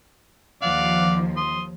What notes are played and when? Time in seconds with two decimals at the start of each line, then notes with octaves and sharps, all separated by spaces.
0.62 D#2 F3 D5 F5 F#5
1.37 C6 D#6